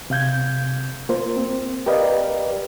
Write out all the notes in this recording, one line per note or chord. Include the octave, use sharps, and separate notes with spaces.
C3 F5 G6 G#6
A#3 F4 C5
C4
G4 A#4 B4 D5 D#5 F5